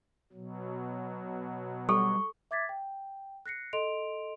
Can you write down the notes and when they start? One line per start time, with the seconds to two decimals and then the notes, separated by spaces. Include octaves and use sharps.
0.33 B2 F#3
1.89 G3 A4 C#6
2.51 E5 D6 G#6 A6 B6
2.69 G5
3.46 F#6 A#6 C7 C#7
3.73 A4 D#5 C6 D7 F7